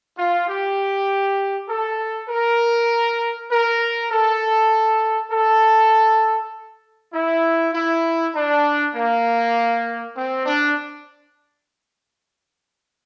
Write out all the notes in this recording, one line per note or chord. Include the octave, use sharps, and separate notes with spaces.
F4
G4
A4
A#4
A#4
A4
A4
E4
E4
D4
A#3
C4
D4